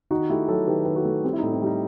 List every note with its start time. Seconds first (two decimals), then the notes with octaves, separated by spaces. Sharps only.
0.11 D#3 D#4 F#4
0.29 A3 E4 G4
0.48 F#3 F#4 A4
0.67 D#3 G4 B4
0.85 D#3 B4
0.96 F#4 A4
1.05 A3
1.24 G3 C4
1.33 E4
1.38 A2 D#4
1.52 C4 E4
1.62 G3 D#4